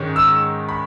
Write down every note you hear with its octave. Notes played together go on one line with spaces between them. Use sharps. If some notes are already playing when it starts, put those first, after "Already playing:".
Already playing: G#2 D#3 G#3 C#4
E6
B5